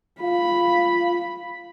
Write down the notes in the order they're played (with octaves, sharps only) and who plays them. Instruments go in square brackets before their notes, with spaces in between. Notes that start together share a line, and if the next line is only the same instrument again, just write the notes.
[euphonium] F4 [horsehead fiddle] B5